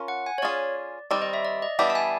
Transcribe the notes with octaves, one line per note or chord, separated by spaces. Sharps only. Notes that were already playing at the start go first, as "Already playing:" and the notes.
Already playing: C#4 F4 A#4
F#5
G#5
C#5
C#4 F4 G#4 D5
D#3 G3 C4 D5
D#5
E5
D5
D#5
E3 G3 B3 D4 G4 E5
A5
G#5